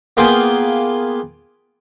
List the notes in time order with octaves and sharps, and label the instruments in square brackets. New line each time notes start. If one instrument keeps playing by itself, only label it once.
[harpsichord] A#3 B3 F4 G#4 G5 G#5